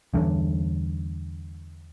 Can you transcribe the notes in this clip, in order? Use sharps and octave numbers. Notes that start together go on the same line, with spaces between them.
E2 G2 D3